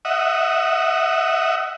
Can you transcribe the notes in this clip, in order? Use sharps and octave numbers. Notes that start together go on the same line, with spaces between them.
D#5 E5 F#5